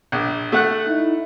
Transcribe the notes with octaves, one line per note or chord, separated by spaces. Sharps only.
A#1
A3 F#5 F#6
D#4 E4